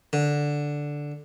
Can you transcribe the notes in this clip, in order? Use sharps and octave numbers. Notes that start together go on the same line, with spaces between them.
D3